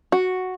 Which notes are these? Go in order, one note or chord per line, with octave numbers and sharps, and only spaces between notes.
F#4